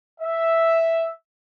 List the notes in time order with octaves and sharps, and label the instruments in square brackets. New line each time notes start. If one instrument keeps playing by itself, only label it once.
[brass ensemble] E5